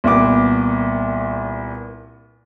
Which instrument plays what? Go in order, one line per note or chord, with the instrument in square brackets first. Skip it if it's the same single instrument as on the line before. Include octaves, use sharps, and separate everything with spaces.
[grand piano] C2 A#2 B3 D6